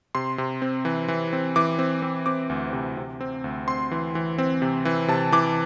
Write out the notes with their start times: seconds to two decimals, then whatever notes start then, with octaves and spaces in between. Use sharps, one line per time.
0.15 C3 C6
0.38 C3
0.62 C4
0.85 E3
1.08 E3
1.33 C4
1.56 E3 D6
1.79 C4
2.02 C4
2.26 C4 D6
2.50 D2
2.73 C3
2.97 C3
3.21 C4
3.44 D2
3.68 C4 C6
3.91 E3
4.15 E3
4.38 C4
4.62 C3
4.85 E3
5.08 C3 A5
5.32 E3 D6